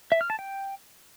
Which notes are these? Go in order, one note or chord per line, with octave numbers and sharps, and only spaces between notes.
E5
F6
A5
G5